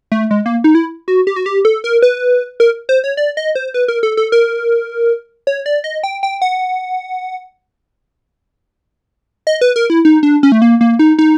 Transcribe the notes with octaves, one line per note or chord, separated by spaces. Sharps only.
A3
G#3
A#3
D#4
E4
F#4
G4
F#4
G4
A4
A#4
B4
A#4
C5
C#5
D5
D#5
C5
B4
A#4
A4
A4
A#4
C#5
D5
D#5
G5
G5
F#5
D#5
B4
A#4
E4
D#4
D4
C#4
A3
A#3
A#3
D#4
D#4